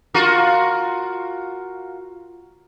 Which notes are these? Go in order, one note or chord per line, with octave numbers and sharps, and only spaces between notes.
F4 F#4 A#4